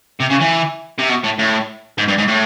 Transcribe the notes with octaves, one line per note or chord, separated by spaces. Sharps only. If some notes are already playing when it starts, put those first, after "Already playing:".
C3
C#3
E3
C3
B2
A2
A2
G#2
G2
G#2
A2